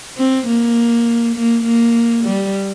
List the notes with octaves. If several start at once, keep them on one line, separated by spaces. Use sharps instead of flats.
C4
A#3
A#3
A#3
G3